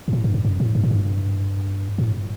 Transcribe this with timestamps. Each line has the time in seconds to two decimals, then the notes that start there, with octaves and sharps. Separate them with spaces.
0.08 G2
0.13 A2
0.24 G2
0.34 F#2
0.45 F#2
0.60 A2
0.75 G2
0.83 A2
0.91 G2
1.98 A2